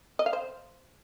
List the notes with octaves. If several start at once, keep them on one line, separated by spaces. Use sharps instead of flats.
D#5
F5
C5